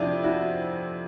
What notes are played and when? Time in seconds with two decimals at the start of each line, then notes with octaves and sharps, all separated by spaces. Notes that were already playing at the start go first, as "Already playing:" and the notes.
Already playing: F2 C3 D4 E4
0.24 E4 F#4